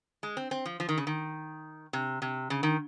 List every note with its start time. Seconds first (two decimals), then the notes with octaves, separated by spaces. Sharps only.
0.23 G#3
0.37 C4
0.51 C4
0.65 F3
0.80 F3
0.89 D#3
0.98 C#3
1.07 D#3
1.93 C3
2.22 C3
2.50 C#3
2.63 D#3